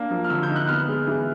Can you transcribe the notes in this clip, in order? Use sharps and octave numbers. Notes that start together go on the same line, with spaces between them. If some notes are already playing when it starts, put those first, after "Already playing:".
Already playing: A#3 D4
F3
F6
D3 E6
G6
D#4
F#6
B3 F6
G#3
E3